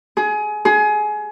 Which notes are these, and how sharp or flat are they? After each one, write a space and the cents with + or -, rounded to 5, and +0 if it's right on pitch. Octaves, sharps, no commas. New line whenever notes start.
G#4 +25
G#4 +25